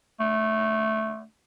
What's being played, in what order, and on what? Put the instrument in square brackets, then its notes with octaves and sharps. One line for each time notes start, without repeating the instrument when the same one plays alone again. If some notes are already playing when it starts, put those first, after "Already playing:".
[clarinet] A3